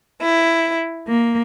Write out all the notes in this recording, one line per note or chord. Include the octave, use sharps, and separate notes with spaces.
E4
A#3